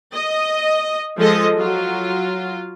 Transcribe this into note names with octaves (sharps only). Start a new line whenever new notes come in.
D#5
F3 G#3 A4 D#5
F#3 F4